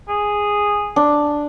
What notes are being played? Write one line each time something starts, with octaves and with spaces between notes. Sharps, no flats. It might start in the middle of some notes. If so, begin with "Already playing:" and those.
G#4
D4